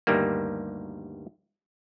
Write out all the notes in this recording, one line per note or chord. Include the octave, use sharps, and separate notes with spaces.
D2 G2 D#3 G3 A#3